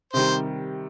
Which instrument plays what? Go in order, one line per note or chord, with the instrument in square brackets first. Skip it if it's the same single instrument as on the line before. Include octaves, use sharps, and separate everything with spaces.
[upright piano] C3 D#3 G3 [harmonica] C5